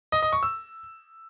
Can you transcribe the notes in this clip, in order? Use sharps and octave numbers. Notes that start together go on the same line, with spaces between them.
D#5
D#5
C#6
E6